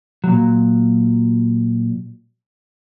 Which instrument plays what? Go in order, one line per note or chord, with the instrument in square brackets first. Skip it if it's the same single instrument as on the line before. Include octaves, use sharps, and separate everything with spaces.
[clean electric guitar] A#2 F#3